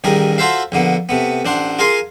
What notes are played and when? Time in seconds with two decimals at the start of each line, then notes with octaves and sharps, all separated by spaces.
0.04 A1 D#3 G3 G#4 A#4
0.38 F4 F#4 A4 C5 E5 F5
0.72 A#1 D3 A#3 B3
1.09 C3 A3 B3
1.45 A1 D4 C5 F#5
1.79 F4 G#4 A#4 F5 G#5 C6